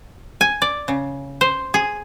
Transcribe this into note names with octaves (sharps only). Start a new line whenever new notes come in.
G#5
D5
C#3
C5
G#4